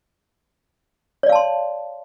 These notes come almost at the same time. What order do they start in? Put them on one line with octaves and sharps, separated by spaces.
C#5 D5 F5 A5 C6